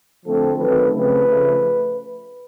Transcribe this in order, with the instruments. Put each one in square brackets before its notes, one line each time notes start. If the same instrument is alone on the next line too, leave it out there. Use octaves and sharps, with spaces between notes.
[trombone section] D3 F3 A3 C4 A4
D#3 F#3 A3 C4 B4
C#3 F3 A3 C4 B4
C#3 F3 A3